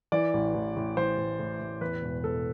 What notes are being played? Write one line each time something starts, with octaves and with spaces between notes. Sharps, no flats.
E3 D5
A1
A1
A1
E3 C5
A1
A2
A1
E2 B4
E1
E1 A4